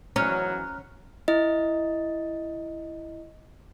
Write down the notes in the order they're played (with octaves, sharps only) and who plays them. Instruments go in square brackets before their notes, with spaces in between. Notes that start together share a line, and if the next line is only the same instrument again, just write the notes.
[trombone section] G#1 E3 F#3 [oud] C#4 [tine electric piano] A#5 F6 F#6
[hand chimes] E4 D#5